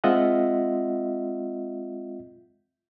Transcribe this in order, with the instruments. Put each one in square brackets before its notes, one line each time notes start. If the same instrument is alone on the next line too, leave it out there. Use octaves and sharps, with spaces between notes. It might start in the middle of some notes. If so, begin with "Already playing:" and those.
[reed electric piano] G#3 C4 F4 D#5 E5 F#5